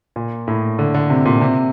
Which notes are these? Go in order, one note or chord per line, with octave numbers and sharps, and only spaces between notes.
A#2
A2
D3
D3
C3
A#2
C3